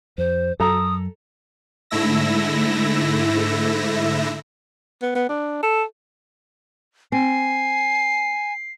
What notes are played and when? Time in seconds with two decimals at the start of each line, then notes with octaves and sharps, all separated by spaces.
0.18 F2 C5
0.60 F#2 F#3 A4 A#5 D#6
1.90 G#2 D3 A3 E4 E6 A#6
5.02 B3
5.15 B3
5.29 D4
5.63 A4
7.12 C4 G#5 C7